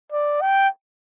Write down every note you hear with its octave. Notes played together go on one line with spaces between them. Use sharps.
D5
G5